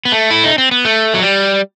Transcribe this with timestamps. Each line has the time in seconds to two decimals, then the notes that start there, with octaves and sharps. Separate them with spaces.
0.05 B3
0.12 A3
0.31 E4
0.44 D#4
0.58 C4
0.71 B3
0.85 A3
1.14 F#3
1.22 G3